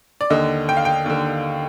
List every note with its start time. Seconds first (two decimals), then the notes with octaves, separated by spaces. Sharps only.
0.21 D5
0.30 D#2 D3 D#5
0.69 G5
0.77 F5
0.85 G5
1.06 D#2 D3